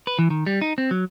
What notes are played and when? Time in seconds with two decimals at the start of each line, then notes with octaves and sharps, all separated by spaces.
0.07 B4
0.19 E3
0.30 D#3
0.46 G3
0.61 D#4
0.78 C4
0.91 F#3